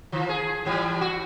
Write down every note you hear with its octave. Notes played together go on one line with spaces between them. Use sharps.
D#3 F3
G#4
A2 E3 G3
F#4